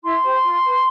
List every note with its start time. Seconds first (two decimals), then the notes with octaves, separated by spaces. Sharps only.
0.03 E4 C6
0.23 G4 C5
0.44 F4
0.64 B4